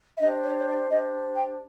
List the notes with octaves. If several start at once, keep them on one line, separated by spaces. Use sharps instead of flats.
E5
D4 G4 C5 D#5
C#5
C#5
D5
D4 G4 C5 D#5
G5